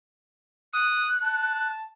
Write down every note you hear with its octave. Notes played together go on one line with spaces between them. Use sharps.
D#6 F#6
A5